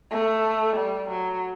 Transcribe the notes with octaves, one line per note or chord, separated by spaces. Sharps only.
A3
G3
F#3